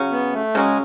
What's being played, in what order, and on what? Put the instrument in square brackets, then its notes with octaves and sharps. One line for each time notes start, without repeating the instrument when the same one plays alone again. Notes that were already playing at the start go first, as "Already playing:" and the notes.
Already playing: [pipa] C#3 F#3 C#4
[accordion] B3
A3
[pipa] C#3 F#3 C#4 [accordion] G#3